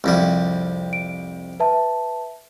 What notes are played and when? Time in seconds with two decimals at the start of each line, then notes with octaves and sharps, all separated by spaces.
0.04 C2 F2 G3
0.93 D7
1.60 B4 E5 A5